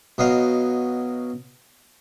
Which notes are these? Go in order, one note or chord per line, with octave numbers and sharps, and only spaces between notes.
B2 F#3 D#5 F5